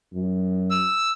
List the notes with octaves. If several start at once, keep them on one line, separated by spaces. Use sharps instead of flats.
F#2
E6